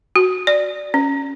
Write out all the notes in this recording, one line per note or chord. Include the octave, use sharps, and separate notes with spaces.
F#4
D5
C#4